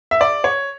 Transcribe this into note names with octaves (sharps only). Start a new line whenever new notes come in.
E5
D5
C#5